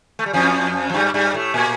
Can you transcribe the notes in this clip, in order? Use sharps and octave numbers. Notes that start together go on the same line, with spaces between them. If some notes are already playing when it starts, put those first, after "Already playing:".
A3
G3
F2 F3
F3
G2 G3
G2 G3
A2 A3
A#2 A#3